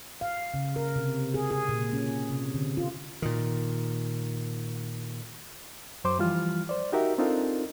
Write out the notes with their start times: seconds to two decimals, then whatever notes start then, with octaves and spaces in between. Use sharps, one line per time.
0.21 F5
0.54 C#3
0.76 A#4
0.96 C3
1.34 G#4
1.51 G#4
1.69 A#2
1.93 C#4
2.31 C3
2.54 D3
2.77 F4
3.22 A#2 D#3
6.04 F#2 F#3 C5 C6 D6
6.19 E3 F3 G3 F4 F6
6.69 C5 D5
6.92 D#4 F#4 G4 A#4 E5
7.18 C4 D4 D#4 F4 A4 A#4